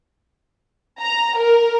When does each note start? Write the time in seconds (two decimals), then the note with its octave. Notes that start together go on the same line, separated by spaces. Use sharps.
0.99 A#5
1.37 A#4